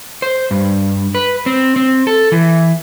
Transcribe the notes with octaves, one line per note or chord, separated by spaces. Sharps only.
C5
G2
B4
C4
C4
A4
E3